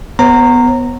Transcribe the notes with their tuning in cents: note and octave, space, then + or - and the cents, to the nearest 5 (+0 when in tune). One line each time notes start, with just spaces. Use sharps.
B3 +0 C#5 -40 A#5 -15